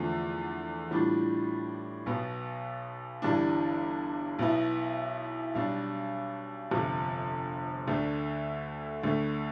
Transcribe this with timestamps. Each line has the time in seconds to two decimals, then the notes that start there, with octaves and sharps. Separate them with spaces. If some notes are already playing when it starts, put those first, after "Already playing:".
Already playing: E2 D3 F3 A3
0.91 A2 E3 G3 D4 F4
2.06 B1 B2 B3
3.22 G1 G2 E3 G3 D4
4.39 B1 B2 B3 E4
5.55 B1 B2 G3 D4
6.71 G1 F2 C3
7.88 D2 D3 A3 D4
9.03 D2 D3 A3